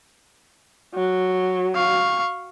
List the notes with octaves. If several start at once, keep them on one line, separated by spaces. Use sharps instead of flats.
F#3
F5 C#6